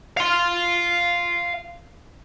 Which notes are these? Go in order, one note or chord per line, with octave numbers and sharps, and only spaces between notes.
F5 C6